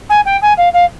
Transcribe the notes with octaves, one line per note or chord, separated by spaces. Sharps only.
G#5
G5
G#5
F5
F5